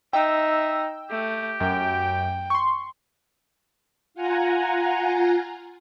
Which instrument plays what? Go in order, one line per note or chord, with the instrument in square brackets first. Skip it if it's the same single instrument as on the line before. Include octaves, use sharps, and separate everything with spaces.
[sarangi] D#4 [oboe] E5 [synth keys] G5 E6
[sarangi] A3 [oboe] G4
[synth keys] F#2 [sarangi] G5
[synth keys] C6 C#6
[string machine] F4 F#5 G#5 A#5